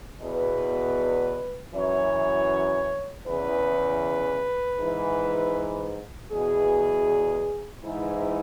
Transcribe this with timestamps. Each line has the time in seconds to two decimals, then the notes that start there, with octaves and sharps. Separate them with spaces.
0.21 E2 B2 B4
1.73 F#2 E3 C#5
3.27 E2 C#3 E3 B4
4.79 G#2 E3
6.31 E2 B2 G#4
7.83 G#2 E3 E4